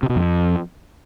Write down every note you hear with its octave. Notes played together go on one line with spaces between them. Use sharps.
C3
B2
F2